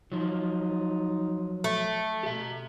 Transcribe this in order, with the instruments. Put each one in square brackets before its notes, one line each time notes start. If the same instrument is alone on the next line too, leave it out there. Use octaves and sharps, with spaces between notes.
[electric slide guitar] F3 F#3 [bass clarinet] D#4
[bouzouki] A3
[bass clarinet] B2 [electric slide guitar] G4 E5